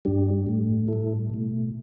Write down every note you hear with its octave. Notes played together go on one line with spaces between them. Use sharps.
G2 G3 D4 G4
A2 A3
A2 G3 E4 A4
B2 A3